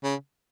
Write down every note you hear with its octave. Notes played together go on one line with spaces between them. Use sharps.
C#3